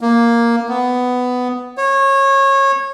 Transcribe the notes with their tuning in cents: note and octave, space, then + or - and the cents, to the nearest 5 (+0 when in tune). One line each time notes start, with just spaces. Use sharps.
A#3 +5
B3 +10
C#5 -25